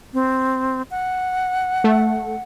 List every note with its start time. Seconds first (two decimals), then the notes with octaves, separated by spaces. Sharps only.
0.14 C4
0.90 F#5
1.84 A3